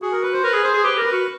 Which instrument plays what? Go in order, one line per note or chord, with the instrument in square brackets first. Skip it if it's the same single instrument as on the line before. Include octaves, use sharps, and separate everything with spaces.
[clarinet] F#4 [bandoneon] G#4
[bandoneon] A#4
B4
C5
[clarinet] A#4 [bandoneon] B4
[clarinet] G#4
[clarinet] G#4 [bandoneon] C5
[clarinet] G#4
[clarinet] G4 [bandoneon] B4
[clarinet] A#4
[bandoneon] B4
[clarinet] F#4